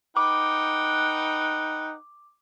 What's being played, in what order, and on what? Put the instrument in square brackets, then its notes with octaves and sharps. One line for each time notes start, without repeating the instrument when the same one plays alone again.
[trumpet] D#4 [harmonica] B4 F#5 G5 [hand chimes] D6